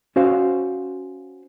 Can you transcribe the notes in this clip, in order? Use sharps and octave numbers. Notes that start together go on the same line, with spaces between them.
C#4 F#4 C5 F5